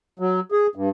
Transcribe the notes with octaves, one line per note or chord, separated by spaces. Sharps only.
F#3
G#4
G2